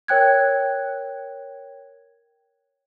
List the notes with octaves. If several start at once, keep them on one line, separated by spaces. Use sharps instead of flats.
A#4 C#5 G5 F#6 G#6